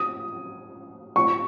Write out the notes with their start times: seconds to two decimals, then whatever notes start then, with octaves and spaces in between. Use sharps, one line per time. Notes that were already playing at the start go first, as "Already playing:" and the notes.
Already playing: D#6
1.16 C#6